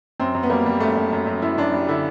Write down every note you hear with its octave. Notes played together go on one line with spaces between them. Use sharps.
F#2 C4
F#2
B3
G3 A#3
G3
F#2 A3
F#2
F#2
F#2
F#2 E4
F#2 D4
G3
D3 E4